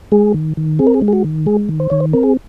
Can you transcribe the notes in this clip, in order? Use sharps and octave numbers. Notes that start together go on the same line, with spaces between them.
G#3 G#4
D#3
D#3
C4 G#4
A#4
G#4
G#3
G#4
F#4
D#3
G#3 G#4
D#3
C5
D#3 C#5
C5
C4 A#4
G#4